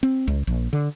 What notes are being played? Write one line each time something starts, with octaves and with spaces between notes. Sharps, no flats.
C4
C#2
A#1
D3